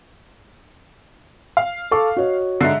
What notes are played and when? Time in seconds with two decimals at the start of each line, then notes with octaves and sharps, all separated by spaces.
1.57 F5
1.91 A4 C#6 D6
2.17 F#4 C#5 D#5
2.61 G#2 D3 E5 F#6 C7